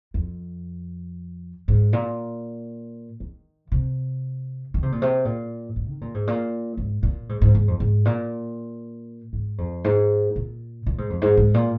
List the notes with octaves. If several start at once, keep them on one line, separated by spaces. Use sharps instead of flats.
F2
G#2
A#2
D#3
C3
D#3
C3
A#2
C3
A#2
G#2
D#3
A#2
G#2
A#2
G#2
A#2
G#2
G#2
G#2
F2
G#2
A#2
G#2
F2
G#2
A#2
A#2
G#2
F2
G#2
G#2
A#2